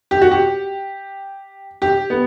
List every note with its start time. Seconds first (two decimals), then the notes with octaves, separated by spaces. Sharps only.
0.11 G4
0.21 F#4
0.31 G4
1.82 G4
2.10 B3